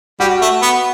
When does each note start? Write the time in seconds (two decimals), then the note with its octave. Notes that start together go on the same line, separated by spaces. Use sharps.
0.20 G3 F#4
0.41 A3
0.62 B3